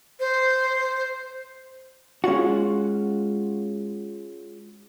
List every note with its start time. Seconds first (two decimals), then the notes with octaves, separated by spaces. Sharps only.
0.20 C5
2.24 G#3 C#4 F4 F#4